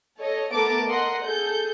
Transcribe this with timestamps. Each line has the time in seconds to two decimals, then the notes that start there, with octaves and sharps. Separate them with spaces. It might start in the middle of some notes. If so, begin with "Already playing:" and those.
0.19 A4 C#5 D#5
0.51 A3 B3 A#4 A5 D6 D7
0.88 A#4 D#5 F#5 C6
1.24 G#4 A4 G6